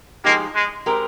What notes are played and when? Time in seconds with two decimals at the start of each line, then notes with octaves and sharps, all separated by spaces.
0.24 F3 G#3 A#3 D#4 G4
0.55 G#3
0.86 G#3 C4 G4 A#4